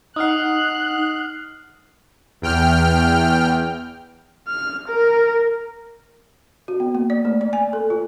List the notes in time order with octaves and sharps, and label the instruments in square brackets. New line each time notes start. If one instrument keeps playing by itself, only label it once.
[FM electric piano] D#4 F#5 [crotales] D#6 F6 C7 [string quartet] F#6
[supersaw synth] E2 G5 F6
[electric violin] F6
A#4
[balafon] F#4
B3
A#3
D5
A3
D5
G#5
A4
F4